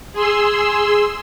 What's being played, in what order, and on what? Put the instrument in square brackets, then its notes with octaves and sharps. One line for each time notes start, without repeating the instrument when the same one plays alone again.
[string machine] G#4 C6 E6